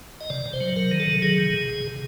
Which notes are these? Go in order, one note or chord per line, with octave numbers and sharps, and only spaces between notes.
D#5
C3 D5
C3
C5
F#3
C3 A#4
D#3
A4
F#3
D#3 G#4
C3
C3
C3
C3